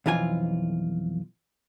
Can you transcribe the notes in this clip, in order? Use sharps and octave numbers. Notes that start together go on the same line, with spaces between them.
B1 F2 E3 F4 G#5